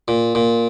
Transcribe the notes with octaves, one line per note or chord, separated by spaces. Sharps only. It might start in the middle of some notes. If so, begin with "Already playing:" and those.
A#2
A#2